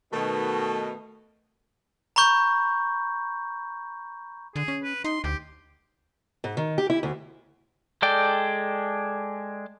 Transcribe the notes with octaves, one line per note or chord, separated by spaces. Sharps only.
B2 D#3 A3
A#5 B5 C#6 G6
D3 G#4
C#4
B4
D#4 C6
D2 G4
G#2
D#3
G4
E4
D2
G#3 A4 D5 G5